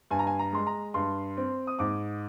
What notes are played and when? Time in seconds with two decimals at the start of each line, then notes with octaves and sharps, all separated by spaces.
0.11 G2 G#5
0.19 A#5
0.27 G#5
0.39 A#5
0.53 G#3 C6
0.67 A#5
0.94 G2 C6
1.37 C4
1.67 D#6
1.79 G#2 D6